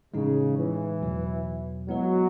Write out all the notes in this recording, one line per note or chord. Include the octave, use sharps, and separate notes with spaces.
A2 C#3 E3 G#3 D#4
E3
E2 B2 F#3
F#3 G#3 B3 E4 B4 D#5